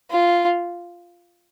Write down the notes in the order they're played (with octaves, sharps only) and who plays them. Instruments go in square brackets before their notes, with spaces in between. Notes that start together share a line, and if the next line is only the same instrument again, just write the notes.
[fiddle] F4